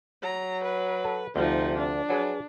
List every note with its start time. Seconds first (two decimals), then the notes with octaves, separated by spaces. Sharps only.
0.23 F#3 A#5
0.64 B4
1.04 A4 F#5 A5
1.36 D2 C3 F3 D#4
1.77 D4
2.09 F#3 G#4 B4 G#5